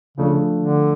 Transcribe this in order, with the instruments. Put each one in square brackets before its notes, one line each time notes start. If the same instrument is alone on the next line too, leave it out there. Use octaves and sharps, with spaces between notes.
[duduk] C#3 [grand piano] F3 A3 D4
[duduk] D3